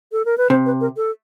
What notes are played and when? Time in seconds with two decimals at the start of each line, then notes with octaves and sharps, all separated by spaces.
0.12 A4
0.25 A#4
0.38 B4
0.50 C3 C5
0.66 B4
0.81 A#4
0.97 A4